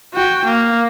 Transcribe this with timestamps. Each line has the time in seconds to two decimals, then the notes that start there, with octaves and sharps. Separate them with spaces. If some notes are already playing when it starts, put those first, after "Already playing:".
0.13 F#4 G5
0.45 A#3